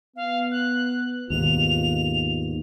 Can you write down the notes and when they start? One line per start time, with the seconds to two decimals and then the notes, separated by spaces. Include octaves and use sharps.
0.16 B3 F5
0.52 F#6
1.30 D#2 G#2 B2 F4 F7